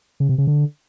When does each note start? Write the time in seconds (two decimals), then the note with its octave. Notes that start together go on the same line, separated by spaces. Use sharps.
0.20 C#3
0.29 C3
0.38 C#3
0.47 D3